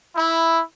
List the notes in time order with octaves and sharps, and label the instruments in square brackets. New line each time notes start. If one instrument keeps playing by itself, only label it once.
[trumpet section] E4